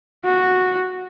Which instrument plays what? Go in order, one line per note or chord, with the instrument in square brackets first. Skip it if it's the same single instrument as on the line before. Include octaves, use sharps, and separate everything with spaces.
[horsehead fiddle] F#4